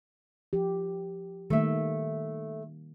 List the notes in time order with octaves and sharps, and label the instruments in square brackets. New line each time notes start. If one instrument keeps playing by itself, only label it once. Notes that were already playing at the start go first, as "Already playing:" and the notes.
[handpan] F3 G4
[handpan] D#3 G3 A#3 [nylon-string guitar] A3 E5